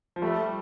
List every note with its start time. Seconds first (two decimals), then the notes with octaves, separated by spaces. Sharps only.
0.16 F3
0.22 G3 A3